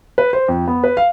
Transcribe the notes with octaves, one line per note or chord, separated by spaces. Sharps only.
B4
C5
F2
B3
B4
F5